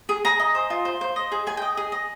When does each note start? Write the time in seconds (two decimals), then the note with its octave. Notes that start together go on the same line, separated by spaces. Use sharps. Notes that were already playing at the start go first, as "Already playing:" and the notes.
0.09 G#4
0.25 G#4 A#5
0.40 D#5
0.55 C5
0.70 F4
0.85 C5
1.01 C5
1.16 D#5
1.32 G#4
1.47 G#4 G#5
1.57 D#5 G5
1.77 G#4
1.92 D#5